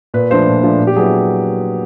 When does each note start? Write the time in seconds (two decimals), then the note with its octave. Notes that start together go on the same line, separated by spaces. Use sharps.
0.14 A#2 B4
0.30 F3 A3 D4 F4 C5
0.47 A#2
0.63 F3 A3 D4 F4
0.80 A#2
0.87 G4
0.96 F#3 B3 E4 G#4